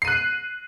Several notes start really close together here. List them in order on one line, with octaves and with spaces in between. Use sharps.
C7 D#7 F#6